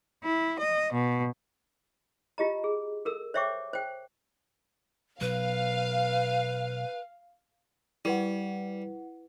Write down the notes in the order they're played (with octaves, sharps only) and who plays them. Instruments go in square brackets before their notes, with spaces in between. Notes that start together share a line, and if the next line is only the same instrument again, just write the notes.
[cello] E4
D#5
B2
[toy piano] F4 G4 D#5 A#5
G#4
A4 A#4 E6
C5 C#5 E5 G5 C#6 D6
C5 G5
[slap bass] B2 F#3 [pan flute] B4 [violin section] F5
[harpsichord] G3 [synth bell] E4 B4 F#5